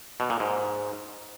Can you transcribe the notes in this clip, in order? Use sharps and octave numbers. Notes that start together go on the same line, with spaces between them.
B2
A#2
G#2